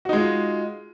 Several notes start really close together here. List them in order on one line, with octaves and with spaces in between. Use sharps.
F#4 D#4 G#3 F4